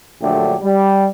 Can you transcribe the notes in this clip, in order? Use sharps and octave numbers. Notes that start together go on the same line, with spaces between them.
A#1 D3 F#3 A3 G4
G3